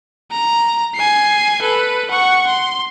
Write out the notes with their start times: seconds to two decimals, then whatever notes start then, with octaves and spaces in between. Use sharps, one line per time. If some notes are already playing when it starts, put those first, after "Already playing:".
0.31 A#5
0.95 G#5 C7
1.62 A4 B4
2.10 F#5 C#6
2.47 C6